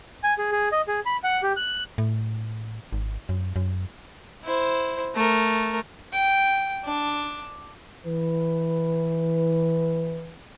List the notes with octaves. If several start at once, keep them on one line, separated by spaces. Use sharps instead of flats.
G#5
G#4
G#4
D#5
G#4
B5
F#5
G4
F#6
A2
G#1
F#2
F#2
E4 C5
A3 A#4
G5
D4
E3 B4